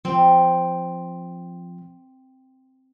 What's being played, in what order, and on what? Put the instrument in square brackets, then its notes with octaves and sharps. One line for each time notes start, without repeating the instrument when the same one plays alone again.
[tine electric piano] F3 [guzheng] C4